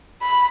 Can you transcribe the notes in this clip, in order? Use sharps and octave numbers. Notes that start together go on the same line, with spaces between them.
B5